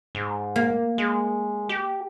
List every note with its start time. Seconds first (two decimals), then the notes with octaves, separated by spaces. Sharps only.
0.15 G#2
0.56 A#3
0.98 G#3
1.69 G4